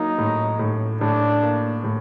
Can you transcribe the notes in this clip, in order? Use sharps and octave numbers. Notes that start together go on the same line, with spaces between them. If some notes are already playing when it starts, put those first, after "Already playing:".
Already playing: F#3 A#3 D#4
A2
A2
A2 D4
A#3
A2